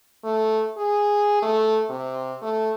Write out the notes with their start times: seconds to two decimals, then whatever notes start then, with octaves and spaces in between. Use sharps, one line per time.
0.24 A3
0.78 G#4
1.42 A3
1.89 C3
2.42 A3